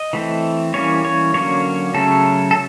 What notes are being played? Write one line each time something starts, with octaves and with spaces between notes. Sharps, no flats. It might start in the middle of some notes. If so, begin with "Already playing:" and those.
Already playing: D#5
E3 A3 C4
E3 G3 A#3 C#4 C#5
C#5
D3 F#3 A#3 C#4 C#5
C#3 F#3 A3 C#4 A4
A4